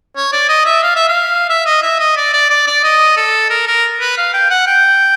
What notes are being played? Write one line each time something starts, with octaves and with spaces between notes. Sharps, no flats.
C#5
D5
D#5
E5
F5
E5
F5
E5
D#5
E5
D#5
D5
D5
D5
D5
D#5
A4
A#4
A#4
B4
F5
G5
F#5
G5